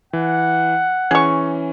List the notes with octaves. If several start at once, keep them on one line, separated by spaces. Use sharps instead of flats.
E3 F#5
E3 C#4 G#4 C#6